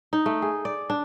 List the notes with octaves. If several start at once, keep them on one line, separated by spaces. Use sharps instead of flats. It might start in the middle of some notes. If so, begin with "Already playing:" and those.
D#4
A3
G#4
D5
D4